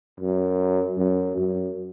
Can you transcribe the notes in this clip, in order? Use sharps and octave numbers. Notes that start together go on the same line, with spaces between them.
F#2
F#2
F#2